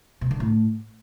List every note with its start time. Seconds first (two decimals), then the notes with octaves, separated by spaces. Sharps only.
0.21 B2
0.31 D3
0.40 A2